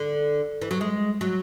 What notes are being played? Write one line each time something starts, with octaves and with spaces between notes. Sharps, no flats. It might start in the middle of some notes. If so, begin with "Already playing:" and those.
Already playing: D3
E3
F#3
G#3
F#3